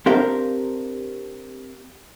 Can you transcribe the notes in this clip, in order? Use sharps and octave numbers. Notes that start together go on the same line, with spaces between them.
C4 D4 G4 A#4 F5